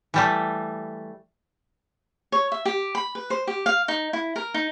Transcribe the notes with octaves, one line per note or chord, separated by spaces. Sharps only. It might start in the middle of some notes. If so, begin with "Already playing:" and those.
E3 G3 A3
C#5
E5
G4
B5
B4
C5
G4
F5
D#4
E4
A#4
D#4